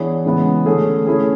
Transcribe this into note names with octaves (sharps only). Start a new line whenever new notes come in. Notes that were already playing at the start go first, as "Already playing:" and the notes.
Already playing: E3 B3 D4 G#4 C#5
C#3 E3 G#3 B3
D3 A3 C#4 G#4
A3 C#4 E4 G#4